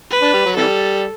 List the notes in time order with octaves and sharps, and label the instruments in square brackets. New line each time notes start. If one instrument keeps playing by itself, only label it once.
[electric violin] B4
[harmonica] D4
G3
F#3
[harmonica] C3 E3 G3 [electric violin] A4